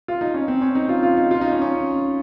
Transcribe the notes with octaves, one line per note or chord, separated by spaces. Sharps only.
F4
D#4
C#4
C4
C#4
D#4
F4
F4
D#4
F4
D#4
C#4
C#4